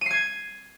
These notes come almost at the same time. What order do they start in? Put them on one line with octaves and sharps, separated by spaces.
D#7 C7 G#6